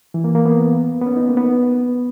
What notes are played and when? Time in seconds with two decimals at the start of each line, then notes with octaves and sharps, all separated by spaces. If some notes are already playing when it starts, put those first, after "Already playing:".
0.14 E3
0.24 A#3
0.35 A#3
0.45 B3
1.01 B3
1.06 C#4
1.17 D#4
1.29 A#3
1.37 B3